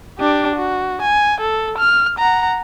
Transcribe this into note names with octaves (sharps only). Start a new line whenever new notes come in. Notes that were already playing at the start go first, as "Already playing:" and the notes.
D4 G4
F#4
G#5
A4
F6
F#5 A#5